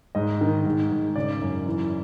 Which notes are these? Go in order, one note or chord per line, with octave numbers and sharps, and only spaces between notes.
G#2 D#5
D#3
G#2
G#2
C#3 D5
F#2
E3